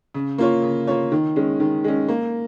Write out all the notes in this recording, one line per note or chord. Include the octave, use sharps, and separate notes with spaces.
C#3
A#3 F4 C#5
C#3
A#3 F4 C#5
D#3
G#3 C#4
D#3
G#3 C#4
A#3